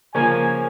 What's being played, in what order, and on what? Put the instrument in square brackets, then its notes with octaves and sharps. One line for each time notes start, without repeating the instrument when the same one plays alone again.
[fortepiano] C#3 F3 A#3 [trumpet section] G#5